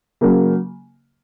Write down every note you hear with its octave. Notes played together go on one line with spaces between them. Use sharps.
C#3 F#3 A#3